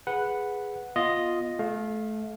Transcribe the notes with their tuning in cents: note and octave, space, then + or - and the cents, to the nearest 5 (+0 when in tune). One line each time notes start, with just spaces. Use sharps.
G#4 +0 B4 +0 F#5 -5
B3 +0 F4 +0 D#5 +0
A3 -30 F5 +10